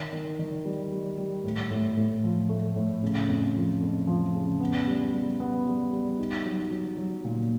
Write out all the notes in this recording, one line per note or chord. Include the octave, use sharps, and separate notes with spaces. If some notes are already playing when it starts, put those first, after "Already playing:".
Already playing: D#3
D#3
D#3
G3
G3
G3
A2
A2
A2
F3
A3
A2
C#3
F2
F3
F2
F3
C#3
B3
G3
G3
B3
G3
G3
D#4
F#3
F#3
F#3
A#2